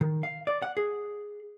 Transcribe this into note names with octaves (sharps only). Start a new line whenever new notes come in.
D#3
F5
D5
F#5
G#4